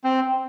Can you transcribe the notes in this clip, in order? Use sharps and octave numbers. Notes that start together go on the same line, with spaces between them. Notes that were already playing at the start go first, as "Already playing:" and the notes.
C4